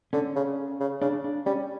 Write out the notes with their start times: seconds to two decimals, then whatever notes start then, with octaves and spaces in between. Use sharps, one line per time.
0.13 D3 C#4
0.36 C#3
0.80 C#3
1.01 C#3 D4
1.24 D4
1.46 G3 C#4